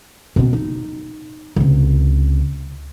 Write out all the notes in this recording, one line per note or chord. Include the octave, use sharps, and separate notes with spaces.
B2 C4
D#4
C#2 C3